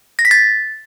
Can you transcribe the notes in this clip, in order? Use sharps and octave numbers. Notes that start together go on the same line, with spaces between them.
A#6
B6
A6